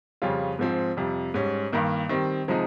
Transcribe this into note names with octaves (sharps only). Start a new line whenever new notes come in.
F2 C#3 G3 C#4 F4
G#2 F3 C4
F2 C3 G3
G#2 G3 C#4
G2 D#3 A#3
D#3 G3 C4
C3 F3 G#3 D#4